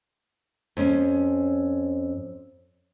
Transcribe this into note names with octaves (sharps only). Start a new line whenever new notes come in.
F2 C#4